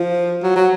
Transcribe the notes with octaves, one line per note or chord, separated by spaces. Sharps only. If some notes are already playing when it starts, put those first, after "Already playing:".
Already playing: F3
F#3
F#3